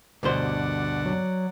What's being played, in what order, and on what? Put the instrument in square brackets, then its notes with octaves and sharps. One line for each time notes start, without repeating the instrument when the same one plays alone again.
[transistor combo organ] D2 [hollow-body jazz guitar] G2 B2 C5 [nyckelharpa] D5 F#5
[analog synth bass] F#3